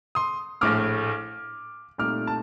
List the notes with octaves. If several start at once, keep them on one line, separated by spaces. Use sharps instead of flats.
C6 D#6
A#1 A2 A3 D6 F6
C2 A#2 A3 D#4 D6 F6
A5